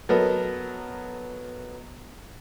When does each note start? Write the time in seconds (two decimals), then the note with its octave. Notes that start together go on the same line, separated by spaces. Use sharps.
0.09 F#3 B3 A4 A#4 D#5